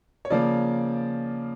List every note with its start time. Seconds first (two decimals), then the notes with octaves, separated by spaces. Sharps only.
0.25 C#5
0.30 C#3 F3 A#3 D5